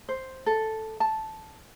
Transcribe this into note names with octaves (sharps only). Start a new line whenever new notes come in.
C5
A4
A5